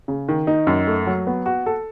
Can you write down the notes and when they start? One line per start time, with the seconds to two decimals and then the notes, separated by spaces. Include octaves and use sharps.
0.08 C#3
0.29 D#3
0.47 D#4
0.67 F#2
0.87 A3
1.07 F#3
1.27 B3
1.46 F#4
1.66 A4